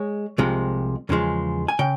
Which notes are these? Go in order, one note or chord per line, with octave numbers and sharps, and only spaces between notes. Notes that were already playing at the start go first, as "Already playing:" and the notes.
Already playing: G#3 C#5
C2 C3 F3 G#3
E2 C#3 F3 G#3
G#5
C#3 G5